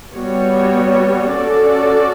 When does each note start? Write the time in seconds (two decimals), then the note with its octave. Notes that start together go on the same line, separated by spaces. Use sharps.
0.14 G3 B3 F#4 C#5
1.31 C#4 F#4 A4 D5